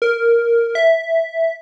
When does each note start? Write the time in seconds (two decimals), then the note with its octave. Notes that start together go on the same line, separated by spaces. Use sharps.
0.02 A#4
0.75 E5